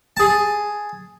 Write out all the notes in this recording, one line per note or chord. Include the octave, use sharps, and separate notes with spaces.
G#4 A5